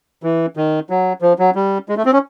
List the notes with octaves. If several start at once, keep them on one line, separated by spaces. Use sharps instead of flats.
E3
D#3
F#3
F3
F#3
G3
G#3
A3
C4
C#4